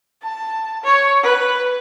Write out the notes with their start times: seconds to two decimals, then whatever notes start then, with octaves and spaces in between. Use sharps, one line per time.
0.23 A5
0.84 C#5
1.23 B4